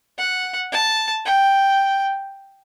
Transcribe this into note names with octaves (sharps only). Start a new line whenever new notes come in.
F#5
A5
G5